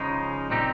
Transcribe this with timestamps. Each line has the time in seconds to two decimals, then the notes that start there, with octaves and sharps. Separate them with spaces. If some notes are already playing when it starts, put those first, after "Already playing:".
Already playing: C#3 F3 G#3 D#4
0.50 A#2 G3 C4 D#4 G4